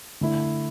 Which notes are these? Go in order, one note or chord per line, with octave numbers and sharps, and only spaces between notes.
D3 A3 E4